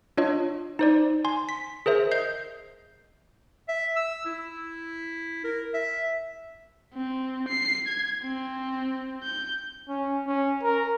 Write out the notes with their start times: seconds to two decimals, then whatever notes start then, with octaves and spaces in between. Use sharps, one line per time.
0.18 D4 F4 C#5 D#5
0.79 D#4 C5 D5
1.24 G#5 C6
1.49 B6
1.86 G#4 A#4 C5 E5
2.11 D#5 G6 C7
3.68 E5
3.96 E6
4.25 E4
5.44 A#4
5.74 E5
6.94 C4
7.49 C7
7.87 G#6
8.24 C4
9.23 G6
9.88 C#4
10.27 C#4
10.63 A#4